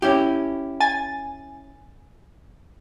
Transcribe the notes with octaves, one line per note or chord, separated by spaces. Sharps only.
C#4 E4 G4
G#5 A6